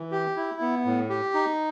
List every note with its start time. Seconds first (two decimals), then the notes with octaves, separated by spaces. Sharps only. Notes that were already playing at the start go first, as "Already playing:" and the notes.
Already playing: E3
0.11 G4
0.36 E4
0.61 B3
0.85 A2
1.10 G4
1.34 D#4